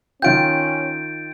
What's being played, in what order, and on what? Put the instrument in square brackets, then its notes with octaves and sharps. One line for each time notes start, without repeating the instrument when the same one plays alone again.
[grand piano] D#3 F4 G5 [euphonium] C#4 [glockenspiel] G6 D7